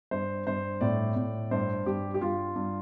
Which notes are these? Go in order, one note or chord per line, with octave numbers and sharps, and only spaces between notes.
G2 C5
G2 C5
A2 D5
A2
G2 C5
G2 G4
G4
G2 F4
G2